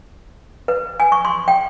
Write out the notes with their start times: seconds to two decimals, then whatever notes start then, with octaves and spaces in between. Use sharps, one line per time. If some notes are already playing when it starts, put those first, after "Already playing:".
0.68 B4
1.00 G#5
1.12 C#6
1.25 C6
1.48 G5